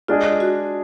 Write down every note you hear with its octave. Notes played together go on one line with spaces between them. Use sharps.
G#3 D4 F4 G#4 D#5
F#4